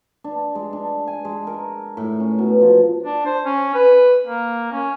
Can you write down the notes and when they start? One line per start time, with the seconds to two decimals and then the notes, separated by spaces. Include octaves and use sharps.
0.24 D4
0.55 G#3
0.73 D4
1.07 G#5
1.25 G#3
1.47 A#4
1.97 A2
2.20 C#4
2.39 B2
2.61 F3
3.03 D4
3.26 C5
3.45 C#4
3.75 B4
4.26 A#3
4.72 C#4